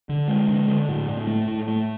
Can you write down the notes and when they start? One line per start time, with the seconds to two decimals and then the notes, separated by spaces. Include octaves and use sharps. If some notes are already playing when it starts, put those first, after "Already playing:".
0.09 D3
0.28 G#3
0.49 D3
0.68 D3
0.89 A2
1.09 A2
1.27 A3
1.47 A2
1.67 A3